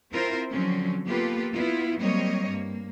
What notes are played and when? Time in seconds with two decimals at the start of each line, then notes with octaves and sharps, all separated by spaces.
0.12 C4 E4 F4 A#4 C5
0.49 D3 F3 F#3 C4 C#4
1.07 A#3 B3 F4 G4 A4 B4
1.54 B3 E4 F4
1.99 F#3 G3 A#3 C4 C#5 D#5
2.50 G2 A#3